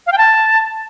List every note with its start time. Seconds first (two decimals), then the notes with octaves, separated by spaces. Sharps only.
0.06 F5
0.12 G5
0.18 A5